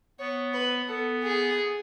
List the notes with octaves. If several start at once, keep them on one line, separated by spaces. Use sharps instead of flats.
B3 C#5
B4
B3 A4
G#4